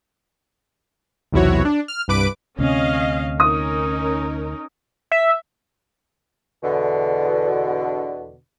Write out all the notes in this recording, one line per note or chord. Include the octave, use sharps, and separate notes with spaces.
B1 E2 C3 E4 F#4 C#5
D4
F6
C2 G2 B4 D6 D7
D2 C3 C4 C#4 D#5 F5
C#4 D#4 A#4 D#6
E5
E2 B2 D3